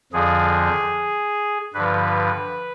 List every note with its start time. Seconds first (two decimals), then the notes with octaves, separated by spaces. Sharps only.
0.13 F2 D3 F3 G#4
1.74 G2 D3 F3 B4